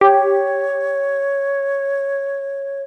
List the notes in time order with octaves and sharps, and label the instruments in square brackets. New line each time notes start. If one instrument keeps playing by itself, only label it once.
[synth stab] G4 [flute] C#5